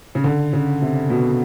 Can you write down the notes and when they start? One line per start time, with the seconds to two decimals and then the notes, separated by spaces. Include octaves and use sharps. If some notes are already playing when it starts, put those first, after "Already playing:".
0.15 C#3
0.24 D3
0.53 C#3
0.82 C3
1.10 B2